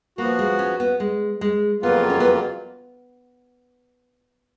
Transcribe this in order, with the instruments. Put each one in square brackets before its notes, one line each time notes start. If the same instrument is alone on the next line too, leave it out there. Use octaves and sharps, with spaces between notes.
[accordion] F3 B3 F#4 [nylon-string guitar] A#3
[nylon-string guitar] G#3
C#4
B3
G#3
G#3
[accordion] F2 C#3 F#3 A#3 F4 [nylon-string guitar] B3
[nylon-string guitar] C#4
B3